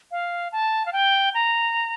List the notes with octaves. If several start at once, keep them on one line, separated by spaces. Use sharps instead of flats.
F5
A5
F5
G5
A#5